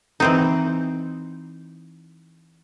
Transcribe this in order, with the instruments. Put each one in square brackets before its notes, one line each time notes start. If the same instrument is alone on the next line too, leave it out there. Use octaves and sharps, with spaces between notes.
[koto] E3 C4 D#4